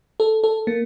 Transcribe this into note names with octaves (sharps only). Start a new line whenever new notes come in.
A4
A4
A#3